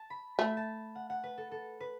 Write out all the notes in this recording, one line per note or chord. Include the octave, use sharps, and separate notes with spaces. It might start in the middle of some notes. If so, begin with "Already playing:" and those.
Already playing: A5
B5
A3 B5
A5
F#5
F#5
B4
A4
A4
B4